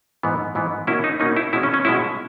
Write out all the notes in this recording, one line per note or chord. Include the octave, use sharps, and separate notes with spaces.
G#2 E3 B3
G#2 E3 B3
B2 A#3 C#4 E4
D#4
B2 A#3 C#4 D#4
E4
B2 G#3 C#4 E4
C#4
C#4
B2 G#3 C#4 E4